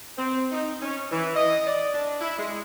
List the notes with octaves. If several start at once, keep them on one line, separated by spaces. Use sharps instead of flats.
C4
D#4
C#4
E3
D#5
D5
D4
E4
G#3